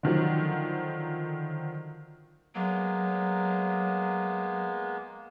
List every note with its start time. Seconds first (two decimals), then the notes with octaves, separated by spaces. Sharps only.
0.03 D3 D#3 F3 F#3
2.55 F#3 G#3 A#3 B3